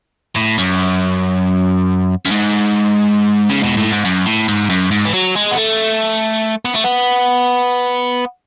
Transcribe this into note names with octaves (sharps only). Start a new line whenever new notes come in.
A2
F#2
F#2
G#2
C#3
B2
A2
G#2
F#2
A2
G#2
F#2
G#2
E3
F#3
G#3
B3
A3
B3
A3
B3